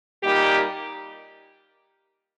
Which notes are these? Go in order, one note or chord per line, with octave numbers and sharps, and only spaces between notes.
A#2 G3 A#3 D#4 G4